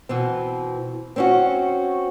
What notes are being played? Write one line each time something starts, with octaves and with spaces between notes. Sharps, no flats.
B2 E3 C4
C4 C#4 F#4